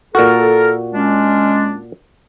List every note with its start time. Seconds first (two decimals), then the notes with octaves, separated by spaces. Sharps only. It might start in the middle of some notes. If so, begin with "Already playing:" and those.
0.15 A#2 F#4 A4 A#4
0.93 G#3 C#4 D4